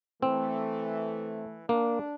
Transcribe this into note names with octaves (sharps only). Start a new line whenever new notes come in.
E3 A3 C4
A#3 D4